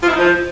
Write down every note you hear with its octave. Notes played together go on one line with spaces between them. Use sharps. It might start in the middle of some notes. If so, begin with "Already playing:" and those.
F4
E4
D#4
F3